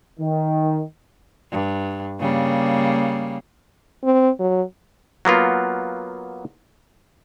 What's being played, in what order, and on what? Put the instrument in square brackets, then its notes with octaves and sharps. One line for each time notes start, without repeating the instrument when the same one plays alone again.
[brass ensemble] D#3
[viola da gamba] G2
C#3 G3 A#3
[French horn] C4
F#3
[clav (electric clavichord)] F#3 A#3 B3 F4